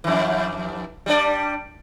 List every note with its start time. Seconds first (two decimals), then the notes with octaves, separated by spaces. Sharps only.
0.04 F2 E3
1.06 G3 D4 D5